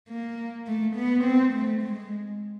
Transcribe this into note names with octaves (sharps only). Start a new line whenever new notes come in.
A#3
A3
B3
C4
A3
G#3